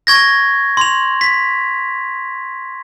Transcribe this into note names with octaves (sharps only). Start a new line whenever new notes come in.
C#6 G#6 A#6
C6 F7
B6